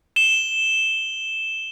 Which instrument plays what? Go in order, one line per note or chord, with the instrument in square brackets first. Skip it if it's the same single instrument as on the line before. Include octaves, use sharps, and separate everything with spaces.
[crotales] E7 G7